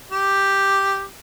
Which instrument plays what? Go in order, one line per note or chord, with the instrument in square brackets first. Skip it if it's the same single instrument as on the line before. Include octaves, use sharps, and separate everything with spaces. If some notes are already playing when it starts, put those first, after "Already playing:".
[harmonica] G4